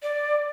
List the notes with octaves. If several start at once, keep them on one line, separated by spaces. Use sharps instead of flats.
D5